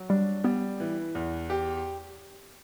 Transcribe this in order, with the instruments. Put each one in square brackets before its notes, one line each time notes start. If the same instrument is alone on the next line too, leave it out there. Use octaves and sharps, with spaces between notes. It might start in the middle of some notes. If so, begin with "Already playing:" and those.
Already playing: [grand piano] F#3
[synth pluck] G3 [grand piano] D4
[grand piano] G3 [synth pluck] B3
[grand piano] E3
E2
G4